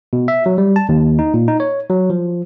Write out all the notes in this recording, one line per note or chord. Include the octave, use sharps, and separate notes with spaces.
B2
E5
F#3
G3
A5
D#2
D#4
A#2
D#4
C#5
F#3
F3